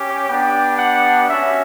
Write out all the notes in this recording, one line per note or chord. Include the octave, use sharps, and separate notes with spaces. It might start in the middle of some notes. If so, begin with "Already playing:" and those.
Already playing: C#4 G4
B3 D4 G4 G5
F#5
C#4 F#4 E5